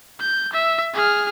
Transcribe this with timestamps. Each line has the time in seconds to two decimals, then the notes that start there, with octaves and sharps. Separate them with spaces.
0.20 G6
0.53 E5
0.94 G#4 F6